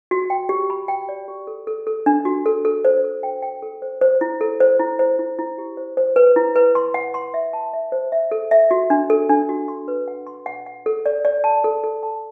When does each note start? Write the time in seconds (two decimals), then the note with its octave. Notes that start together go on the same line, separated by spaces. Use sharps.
0.11 F#4
0.30 G5
0.49 G4
0.70 B5
0.88 G5
1.09 D5
1.28 G4
1.47 A4
1.67 A4
1.87 A4
2.06 D4
2.25 F#4
2.46 A4
2.65 A4
2.85 C5
3.04 A4
3.23 G5
3.43 G5
3.63 A4
3.82 C5
4.01 C5
4.21 E4
4.41 A4
4.60 C5
4.79 E4
4.99 C5
5.19 E4
5.39 E4
5.58 G4
5.77 C5
5.97 C5
6.16 B4
6.36 E4
6.56 B4
6.75 C6
6.94 F#5
7.14 C6
7.34 E5
7.53 A5
7.74 E5
7.92 C5
8.12 E5
8.31 A4
8.51 E5
8.71 F#4
8.90 D4
9.10 A4
9.29 D4
9.49 F#4
9.68 C6
9.88 B4
10.08 F#5
10.27 C6
10.46 F#5
10.66 F#5
10.86 A4
11.06 D5
11.25 D5
11.44 A5
11.64 A4
11.84 A4
12.03 A5